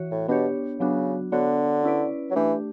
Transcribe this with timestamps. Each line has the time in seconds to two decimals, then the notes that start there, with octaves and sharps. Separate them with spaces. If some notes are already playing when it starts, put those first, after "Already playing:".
Already playing: E3 F#4 C#5
0.11 A2
0.28 B2 B3 D4 G4 C#5
0.80 C#3 F#3 B3 D4 F#4
1.32 D3 B3 D4 F#4 C#5
1.84 C#4 E4 B4 D5
2.31 F#3
2.35 E3 A3 D4 G4